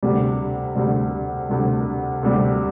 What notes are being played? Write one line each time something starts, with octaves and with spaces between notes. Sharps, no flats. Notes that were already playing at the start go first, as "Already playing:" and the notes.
D2 C3 G3
D2 C3 G3
D2 C3 G3
D2 C3 G3